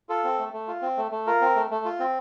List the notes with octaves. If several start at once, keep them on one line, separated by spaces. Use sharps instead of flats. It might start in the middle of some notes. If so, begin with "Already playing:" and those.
F4 A4
C4
A3
A3
F4
C4
A3
A3
F4 A#4
C4
A3
A3
F4
C4